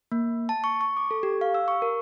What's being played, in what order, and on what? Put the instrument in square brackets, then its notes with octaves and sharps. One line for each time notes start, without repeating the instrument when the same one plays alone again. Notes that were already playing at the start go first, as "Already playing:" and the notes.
[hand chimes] A#3
A5
C#6
C#6
D6
A4
G4
F5
E6
C#6
A#4